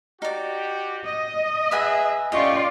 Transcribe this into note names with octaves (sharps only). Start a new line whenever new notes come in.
D#4 F#4 G4 D5
D#5
G#4 B4 E5 F#5 G#5
A3 C#4 F4 G4 D5 D#5 C#6